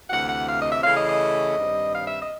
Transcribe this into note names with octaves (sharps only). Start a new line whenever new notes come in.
D2 C3 E3 F#5
F#5
F5
D#5
E5
C#3 E3 A3 C#4 F5
D#5
D#5
G2 D#3 G3 C4
F5
E5
D#5